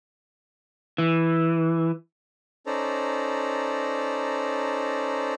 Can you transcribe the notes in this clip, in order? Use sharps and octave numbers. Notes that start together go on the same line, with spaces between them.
E3
C#4 D#4 A4 C5 D5 A#5